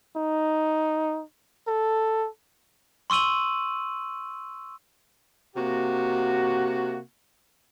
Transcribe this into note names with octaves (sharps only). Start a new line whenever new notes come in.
D#4
A4
C6 C#6 E6 D#7 F#7
C3 A#3 F#4